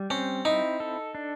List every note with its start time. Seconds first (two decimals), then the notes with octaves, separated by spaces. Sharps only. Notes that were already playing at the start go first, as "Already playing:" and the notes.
Already playing: G3
0.10 C4 C#4
0.45 D#4 E4
0.80 A4
1.15 D4